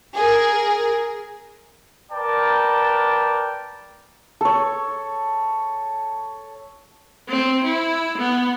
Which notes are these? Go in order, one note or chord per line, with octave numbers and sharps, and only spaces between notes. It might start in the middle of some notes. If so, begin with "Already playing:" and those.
G#4 A#4
A#4 B4 D5 G5 A5
A4 C#5
C4
E4
B3